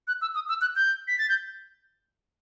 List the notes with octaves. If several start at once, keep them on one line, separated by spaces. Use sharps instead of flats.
F#6
E6
D#6
E6
F#6
G6
B6
A6
G6